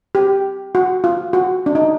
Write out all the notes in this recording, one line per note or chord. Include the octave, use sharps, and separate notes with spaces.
G4
F#4
F4
F#4
D4
D#4